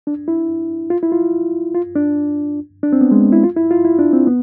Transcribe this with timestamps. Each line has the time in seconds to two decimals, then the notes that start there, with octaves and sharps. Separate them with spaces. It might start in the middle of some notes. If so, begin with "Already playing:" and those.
0.07 D4
0.28 E4
0.90 F4
1.03 E4
1.12 F4
1.75 F4
1.96 D4
2.83 D4
2.93 C4
3.01 B3
3.11 G#3
3.32 E4
3.43 F4
3.56 E4
3.71 F4
3.85 E4
3.99 D4
4.13 C4
4.27 B3